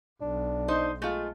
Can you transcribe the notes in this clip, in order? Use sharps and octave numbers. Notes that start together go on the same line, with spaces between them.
B1 D4
D#4 C5
G#3 A3 F4